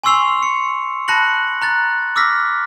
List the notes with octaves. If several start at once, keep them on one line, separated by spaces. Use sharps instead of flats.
G#5 C6 C#6 E6 C7 F7
C#7
A5 B5 F#6 A#6 C#7 F#7
A#5 F#6 A6
D6 E6 F6 A#6 B6